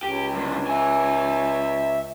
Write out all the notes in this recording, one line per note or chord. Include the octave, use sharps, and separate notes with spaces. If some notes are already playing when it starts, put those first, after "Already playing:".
C#2 G4
F#2 D3
E5 G#5